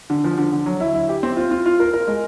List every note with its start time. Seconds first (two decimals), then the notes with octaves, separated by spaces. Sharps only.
0.10 D3
0.24 F3
0.38 D3
0.52 D3
0.66 F#3
0.80 E4
0.94 E4
1.09 G4
1.23 C4
1.36 F4
1.51 F4
1.66 F4
1.80 A#4
1.93 A#4
2.07 G#3